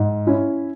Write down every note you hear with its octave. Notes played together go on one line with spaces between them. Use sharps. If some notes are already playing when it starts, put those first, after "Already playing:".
Already playing: G#2
C#4 E4